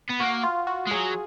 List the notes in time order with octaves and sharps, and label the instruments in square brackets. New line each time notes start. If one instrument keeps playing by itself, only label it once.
[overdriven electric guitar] B3
[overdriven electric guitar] A#3 [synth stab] F#4
[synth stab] F4
F#4
[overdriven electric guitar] G#3
[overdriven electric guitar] F#3 [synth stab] G#4